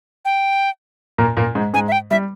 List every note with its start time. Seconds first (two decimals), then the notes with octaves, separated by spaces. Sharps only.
0.25 G5
1.18 A#2 A#3
1.37 A#2 A#3
1.55 G#2 G#3
1.73 G#2 G#3 G#5
1.88 E5
1.92 G5
2.11 G3 E5